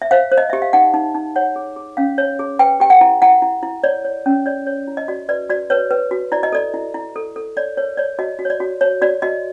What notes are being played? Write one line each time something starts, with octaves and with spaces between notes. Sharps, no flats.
E5
C5 F5
C5
D#5
G4 E5
F5
D#4 F#5
D#4
D#4
C#5 F#5
G#4
G#4
C#4 F5
C#5
G#4
B4 G5
G4 G5
F#5
E4
E4 F#5
E4
E4
C#5 D5
C#5
C#4
C#5 D5
C#5
E4
D#5
F#4 D5
B4 D5
F#4 D5
B4 C#5
B4
F#4
E4 D5
D#5
A4 D5
E4
E4
A4
A4
C#5 D5
A#4 C#5
C#5 D5
F#4 D#5
F#4
C#5
D5
F#4
C#5
F#4 D5
F#4 D#5